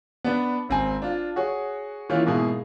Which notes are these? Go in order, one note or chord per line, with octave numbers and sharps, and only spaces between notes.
B3 D4 B4
G#1 C4 G#5
D4 F4
F#4 G#4 C#5
D#3 E3 A#3 C#4 E4 F4
G#2 B2 A#3 E4 G#4